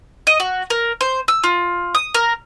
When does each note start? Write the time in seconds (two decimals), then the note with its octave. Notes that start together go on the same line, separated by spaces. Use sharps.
0.27 D#5
0.40 F#4
0.70 A#4
1.01 C5
1.28 E6
1.44 F4
1.95 D#6
2.15 A#4